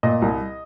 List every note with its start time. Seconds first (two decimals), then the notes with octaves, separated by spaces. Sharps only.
0.03 A#2 D#5
0.22 C2